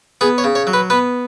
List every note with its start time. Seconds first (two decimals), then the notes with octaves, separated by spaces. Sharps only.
0.21 B3 G#4
0.38 C#5
0.44 C#3
0.55 C#5
0.67 F#3
0.73 B4
0.90 B3 B4